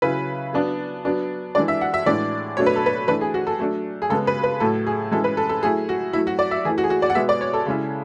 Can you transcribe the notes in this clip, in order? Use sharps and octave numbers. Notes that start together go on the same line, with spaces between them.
C#3 F#3 C#4 E4 B4
F#3 B3 D4
F#3 B3 D4
E3 G#3 D4 D5
E5
F#5
E5
A2 E3 G#3 D4 D5
B2 F#3 A3 D4 C#5
B4
A4
B4
E3 A3 D4 B4
G#4
F#4
A4
F#3 A3 D4
G#4
C#3 G#3 B3 A4
B4
B4
A2 F#3 A3 E4 A4
G#4
E3 G#3 C#4 E4 A4
B4
A4
A4
F#3 A3 E4 G#4
F#4
F#3 A3 E4
F#4
D5
E5
E3 A3 E4 G#4
F#4
G#4
F#4
D5
F#5
B2 G#3 B3 E5
D5
C#5
A4
C#3 G#3 C#4 E4